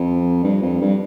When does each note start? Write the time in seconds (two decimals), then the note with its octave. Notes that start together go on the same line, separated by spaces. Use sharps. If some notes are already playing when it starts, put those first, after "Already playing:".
Already playing: F2
0.44 G2
0.62 F2
0.81 G2